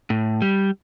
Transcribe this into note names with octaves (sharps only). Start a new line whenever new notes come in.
A2
G3